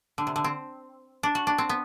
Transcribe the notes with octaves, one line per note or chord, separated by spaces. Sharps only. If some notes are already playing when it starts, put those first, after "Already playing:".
D3
C3
D3
C4
D4
F#4
D4
C4
B3